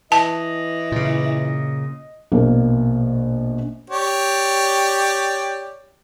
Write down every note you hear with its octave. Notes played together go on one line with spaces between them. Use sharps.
E3 D#5 A5
A#2 C#3
A#1 B2 A#3
G4 C#5 D5